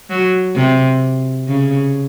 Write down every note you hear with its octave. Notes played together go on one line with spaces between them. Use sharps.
F#3
C3
C#3